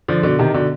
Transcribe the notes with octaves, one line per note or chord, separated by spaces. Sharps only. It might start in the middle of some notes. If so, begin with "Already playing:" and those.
D3 F3
B2 D3
C3 D#3
B2 D3